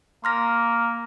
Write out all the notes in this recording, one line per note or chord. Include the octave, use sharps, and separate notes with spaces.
A#3 C6 F6 A#6